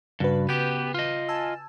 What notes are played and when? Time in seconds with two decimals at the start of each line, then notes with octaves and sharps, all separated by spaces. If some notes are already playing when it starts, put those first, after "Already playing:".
0.20 G2 C#3 F#4 B4
0.49 B3 G4 G6
0.94 F4 D#5
1.29 G#5 A5 E6